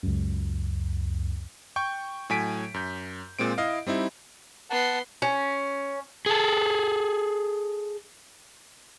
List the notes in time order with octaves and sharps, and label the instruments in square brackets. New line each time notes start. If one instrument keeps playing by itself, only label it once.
[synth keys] C#2 F#2
[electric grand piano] G5 C#6 G6
A2 F#3 G#5 B6 D7
F#2 G6
A#2 G#3 C4 D7
E4 D#5 F5
G3 C4 D#4 E4
[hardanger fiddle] B3 C6 [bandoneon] F#5 A5
[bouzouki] C#4
[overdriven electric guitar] G#4 A4